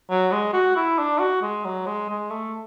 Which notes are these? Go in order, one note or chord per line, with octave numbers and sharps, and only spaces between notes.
F#3
G#3
F#4
E4
D4
F#4
G#3
F#3
G#3
G#3
A3